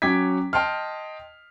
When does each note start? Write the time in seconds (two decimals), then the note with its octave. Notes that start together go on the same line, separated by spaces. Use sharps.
0.02 F#3 C#4 G5 D6 G#6 B6
0.53 D#5 G5 A5 C6 F6